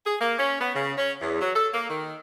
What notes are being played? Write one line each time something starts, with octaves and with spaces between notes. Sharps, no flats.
G#4
A#3
C#4
B3
C#3
C#4
E2
F#3
A4
A#3
D#3